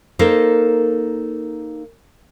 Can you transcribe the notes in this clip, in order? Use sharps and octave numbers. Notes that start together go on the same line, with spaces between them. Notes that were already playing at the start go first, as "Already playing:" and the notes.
A#3 D#4 A4 A#4 C5